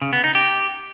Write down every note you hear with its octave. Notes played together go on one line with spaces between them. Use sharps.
C#3
B3
D#4
G4